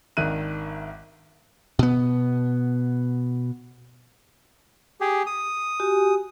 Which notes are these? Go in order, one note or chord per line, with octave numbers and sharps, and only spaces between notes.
G#1 D#3 D4 E5 F#6 D#7
B2 B3
G4 G#4
D#6
F#4 G4 G#5